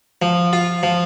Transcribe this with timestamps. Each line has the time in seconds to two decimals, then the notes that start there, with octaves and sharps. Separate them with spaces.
0.22 F3
0.53 F4
0.83 F3